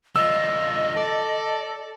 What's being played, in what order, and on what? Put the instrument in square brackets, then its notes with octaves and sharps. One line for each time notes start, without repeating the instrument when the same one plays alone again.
[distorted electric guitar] D3 F4 [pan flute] D#5 [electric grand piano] E6
[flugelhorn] A4 [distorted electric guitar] D5